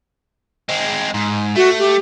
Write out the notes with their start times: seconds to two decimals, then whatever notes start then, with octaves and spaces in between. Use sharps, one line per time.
0.69 G#3 C4
1.14 G#2
1.56 A3 F#4
1.78 G4